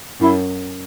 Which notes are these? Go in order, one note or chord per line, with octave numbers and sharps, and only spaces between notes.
F#2 E4